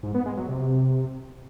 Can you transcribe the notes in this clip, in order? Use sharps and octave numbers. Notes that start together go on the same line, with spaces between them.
G#2
B3
G#3
F#3
C3